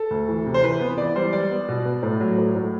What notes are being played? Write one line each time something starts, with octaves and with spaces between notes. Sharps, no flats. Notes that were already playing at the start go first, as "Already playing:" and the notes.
Already playing: A4
D2
E3
C3
C5
E3 B4
B3
E3 D5
G3 C5
G3 D5
B3
B2
B3
A2
F#3
A2
A2